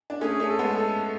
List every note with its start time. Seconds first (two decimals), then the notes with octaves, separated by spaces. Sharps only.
0.10 D4
0.21 A3 C#4 G#4
0.40 A3 C#4
0.49 A4
0.59 G#3 B3
0.77 A4